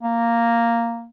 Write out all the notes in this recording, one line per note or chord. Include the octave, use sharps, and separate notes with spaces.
A#3